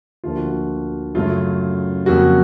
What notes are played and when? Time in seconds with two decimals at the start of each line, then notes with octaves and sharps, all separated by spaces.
0.24 D2 D3 F3 A#3 F4
0.36 F#4
0.48 F4
1.15 F#2 C#3 F#3 A3 F4
2.06 F2 C#3 F#3 A#3 F#4